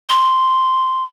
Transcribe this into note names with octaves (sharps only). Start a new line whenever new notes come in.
C6